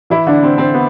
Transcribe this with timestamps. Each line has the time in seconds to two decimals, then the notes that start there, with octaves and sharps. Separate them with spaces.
0.10 E3 E4
0.27 D3 D4
0.43 C4
0.58 C4
0.74 B3